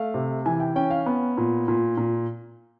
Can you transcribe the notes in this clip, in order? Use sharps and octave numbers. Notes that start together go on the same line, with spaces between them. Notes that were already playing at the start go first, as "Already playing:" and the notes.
Already playing: A3 F5
C3
E3 G#5
G5
C#4 G5
F5
B3
A#2
A#2
A#2